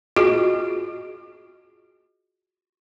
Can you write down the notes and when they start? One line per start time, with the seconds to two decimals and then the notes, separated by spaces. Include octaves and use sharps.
0.16 F4 F#4 G#4 D#5